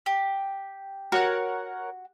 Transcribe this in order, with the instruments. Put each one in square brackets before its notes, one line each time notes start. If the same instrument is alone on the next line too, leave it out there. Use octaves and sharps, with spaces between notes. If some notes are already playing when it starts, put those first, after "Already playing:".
[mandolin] G4
[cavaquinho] F#4 [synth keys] A#4 C#5 F#5